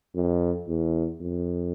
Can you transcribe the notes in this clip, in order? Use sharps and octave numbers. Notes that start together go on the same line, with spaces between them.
F2
E2
F2